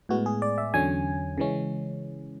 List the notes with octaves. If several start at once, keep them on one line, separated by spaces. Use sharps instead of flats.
A2 G#3 B3 F#4
G#4
D5
E5
E2 D3 F#3 C#4 G#5
C#3 E3 G#3 C#4